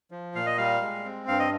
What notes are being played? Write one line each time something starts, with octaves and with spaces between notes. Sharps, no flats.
F3
A#2 F5
D#5
G3 F5
G#3
C4
G2 F5
D#5